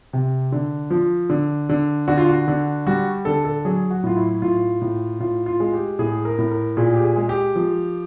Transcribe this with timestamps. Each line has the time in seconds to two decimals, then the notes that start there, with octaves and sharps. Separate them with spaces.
0.13 C3
0.52 D3
0.90 F3
1.30 D3
1.69 D3
2.08 D3 F#4
2.18 F4
2.29 F#4
2.48 D3
2.87 G3 F#4
3.25 D3 A4
3.45 A4
3.65 F#3 G#4
3.90 F#4
4.03 A2 F4
4.16 E4
4.42 A2 F4
4.82 A2
5.20 A2 F4
5.46 F4
5.60 G#3
5.73 G4
5.99 A2 G#4
6.25 A#4
6.39 A2
6.52 A#4
6.77 A#2 G#4
6.94 G4
7.04 G#4
7.16 G#3
7.29 G4
7.55 F3